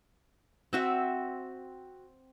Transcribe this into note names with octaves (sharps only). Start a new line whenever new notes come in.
C4 F#4 E5